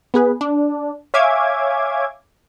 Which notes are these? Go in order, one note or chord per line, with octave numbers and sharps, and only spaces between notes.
B3 G#4 B4
D4
C#5 E5 F5 G#5 D6 G#6